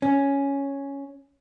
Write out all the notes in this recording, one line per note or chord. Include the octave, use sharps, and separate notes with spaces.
C#4